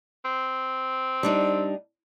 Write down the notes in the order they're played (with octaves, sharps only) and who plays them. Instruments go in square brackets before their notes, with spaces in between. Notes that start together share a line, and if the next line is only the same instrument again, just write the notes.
[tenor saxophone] C4
[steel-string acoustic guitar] G3 D4 D#4